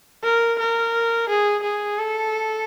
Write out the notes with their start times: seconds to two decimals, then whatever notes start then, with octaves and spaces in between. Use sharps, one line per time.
0.24 A#4
0.59 A#4
1.29 G#4
1.63 G#4
1.99 A4